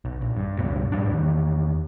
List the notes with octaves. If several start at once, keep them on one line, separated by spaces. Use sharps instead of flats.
B1
A#1
G2
C#2 G2 B2
G#2 G3 D4
E2 D#3